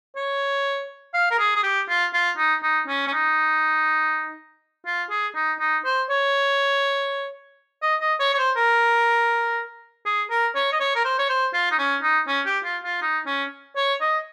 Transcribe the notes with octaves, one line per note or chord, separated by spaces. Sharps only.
C#5
F5
A#4
G#4
G#4
G4
F4
F4
D#4
D#4
C#4
C#4
D#4
F4
G#4
D#4
D#4
C5
C#5
D#5
D#5
C#5
C#5
C5
A#4
G#4
A#4
C#5
D#5
C#5
A#4
C5
C#5
C5
F4
D#4
C#4
D#4
C#4
G4
F4
F4
D#4
C#4
C#5
D#5